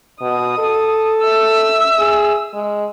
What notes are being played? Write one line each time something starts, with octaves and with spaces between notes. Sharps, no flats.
B2 D#6
A4
E5 E6
G#4
G#3